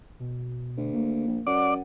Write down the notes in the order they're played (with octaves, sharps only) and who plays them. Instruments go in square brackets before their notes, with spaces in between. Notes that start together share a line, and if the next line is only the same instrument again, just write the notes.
[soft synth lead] B2
[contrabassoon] D2
[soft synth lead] A#3
[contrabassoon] A#1
[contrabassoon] F#2 [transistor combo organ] D5 [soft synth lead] F#5